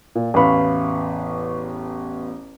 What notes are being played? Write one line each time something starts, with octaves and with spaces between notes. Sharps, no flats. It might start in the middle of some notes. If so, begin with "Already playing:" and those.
A#2
A1 E2 B3 F5 B5 C#6